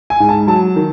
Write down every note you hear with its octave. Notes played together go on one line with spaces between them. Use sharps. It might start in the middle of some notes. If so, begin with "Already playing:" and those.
G#5
G#2
A5
F#3 A5
D#3